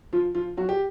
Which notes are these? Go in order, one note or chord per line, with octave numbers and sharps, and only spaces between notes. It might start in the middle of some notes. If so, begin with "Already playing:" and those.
F3 F4
F3 F4
F#3 F#4
G4